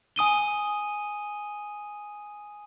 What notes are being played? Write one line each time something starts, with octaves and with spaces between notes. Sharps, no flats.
G#5 D#6 D#7 G7